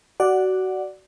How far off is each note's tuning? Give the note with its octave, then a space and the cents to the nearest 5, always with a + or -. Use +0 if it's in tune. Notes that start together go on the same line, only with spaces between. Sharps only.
F#4 +25 D5 +0 F#5 +0